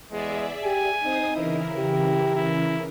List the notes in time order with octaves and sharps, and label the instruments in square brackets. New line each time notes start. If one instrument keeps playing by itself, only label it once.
[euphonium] E2 [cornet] G#3 [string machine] G#4 D5 E5
[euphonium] G4 [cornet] G#5
[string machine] C4 C5 D#6 [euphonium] D#4
[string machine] C#3 E3 A#4 [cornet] E4
[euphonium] G4
[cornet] E4